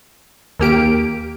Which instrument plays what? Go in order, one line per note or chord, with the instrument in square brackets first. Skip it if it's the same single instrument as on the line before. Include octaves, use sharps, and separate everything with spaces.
[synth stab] D#2 A#3 G4 D7